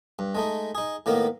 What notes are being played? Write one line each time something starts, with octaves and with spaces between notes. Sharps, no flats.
G2
G#3 A3 D#4
D#4 G#4
A2 D#3 A#3 B3